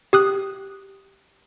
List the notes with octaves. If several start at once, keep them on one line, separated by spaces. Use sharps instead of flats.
G4 D#6 F#6